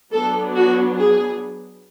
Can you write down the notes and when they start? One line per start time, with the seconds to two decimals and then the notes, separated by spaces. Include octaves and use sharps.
0.13 F#3 B3 D4 A4
0.55 F#4
0.98 G#4